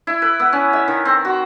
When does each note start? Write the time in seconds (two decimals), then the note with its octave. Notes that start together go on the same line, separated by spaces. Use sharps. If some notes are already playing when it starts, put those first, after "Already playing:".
0.07 E4
0.22 B4
0.40 B3
0.53 C#4
0.73 E5
0.88 D#3
1.05 C4
1.25 F#4